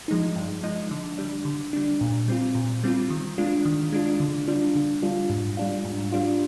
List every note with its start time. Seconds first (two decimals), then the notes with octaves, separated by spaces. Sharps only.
0.08 F3 G#3 D#4
0.36 G2
0.63 F3 G#3 D#4
0.91 D3
1.18 G3 D4
1.45 D3
1.73 G3 D4
2.01 A#2
2.28 G3 C4 F4
2.55 A#2
2.83 G3 C4 F4
3.10 D#3
3.38 G#3 D4 F4
3.65 D#3
3.92 G#3 D4 F4
4.20 D3
4.48 G3 D4 F4
4.75 D3
5.03 G3 D4 F4
5.30 G#2
5.57 G3 D4 F4
5.85 G#2
6.12 G3 D4 F4